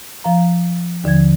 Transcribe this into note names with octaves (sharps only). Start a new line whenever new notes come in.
F3 F5 A#5
D#2 D3 F3 G#6